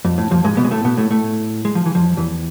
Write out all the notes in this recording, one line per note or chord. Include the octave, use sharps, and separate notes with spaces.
F2
A2
F2 F3
G#2 G#3
B2 B3
G#3
A2 A3
B2 B3
A2 A3
A2 A3
G#3
F3
E3
F2 F3
E2 E3